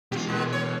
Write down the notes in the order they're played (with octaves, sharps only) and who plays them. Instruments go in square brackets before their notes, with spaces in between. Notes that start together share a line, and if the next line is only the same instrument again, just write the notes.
[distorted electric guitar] B2 E3 [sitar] F4 G4
[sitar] A#2 G#3
C#5